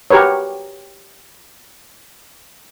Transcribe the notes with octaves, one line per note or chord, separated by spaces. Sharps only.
F#4 G4 A#4 B4 C#5